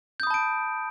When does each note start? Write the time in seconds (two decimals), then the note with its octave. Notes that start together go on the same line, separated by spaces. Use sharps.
0.20 G6
0.23 D#6
0.27 B5
0.31 A5
0.34 D7